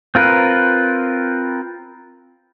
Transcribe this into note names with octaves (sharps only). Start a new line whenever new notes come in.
C4 F4 A#4 B4